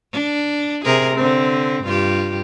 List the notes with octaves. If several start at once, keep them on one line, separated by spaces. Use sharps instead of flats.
D4
C3 G#4 A#4
D3 C4
G2 F4 G4